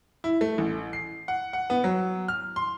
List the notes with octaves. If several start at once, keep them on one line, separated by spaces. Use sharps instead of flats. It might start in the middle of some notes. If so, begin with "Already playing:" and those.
E4
A3
A1
C7
F#5
F#5
B3
F#3
F6
C6